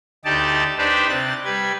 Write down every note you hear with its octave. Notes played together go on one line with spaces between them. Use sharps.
D2 D#4 G4 D5 A5
D4 D#4 G4 B4 C5 D5
C3 F#6 A6
G3 B4 G#6